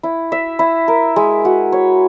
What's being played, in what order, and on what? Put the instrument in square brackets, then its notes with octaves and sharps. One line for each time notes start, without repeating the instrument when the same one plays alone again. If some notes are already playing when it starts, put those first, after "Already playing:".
[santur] E4
E5
E4
A#4
G#3
F#4
C#5